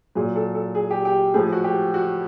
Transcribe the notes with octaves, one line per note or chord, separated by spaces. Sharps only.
A#2 F#3 G#4
A4
A4
G#4
G4
G4
A2 F3 G#4
F#4
G4
F#4